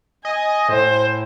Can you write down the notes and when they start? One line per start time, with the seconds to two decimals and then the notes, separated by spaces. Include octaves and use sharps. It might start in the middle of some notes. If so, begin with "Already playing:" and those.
0.25 D#5 G#5
0.69 A2 C5